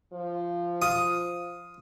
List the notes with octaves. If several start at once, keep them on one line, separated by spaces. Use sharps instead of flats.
F3
F4 D#6